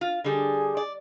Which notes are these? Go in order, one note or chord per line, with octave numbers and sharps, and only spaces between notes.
F4
D3 G3 G#4
D5